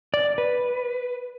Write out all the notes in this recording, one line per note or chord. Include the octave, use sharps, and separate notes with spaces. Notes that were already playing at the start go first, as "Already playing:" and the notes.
D5
B4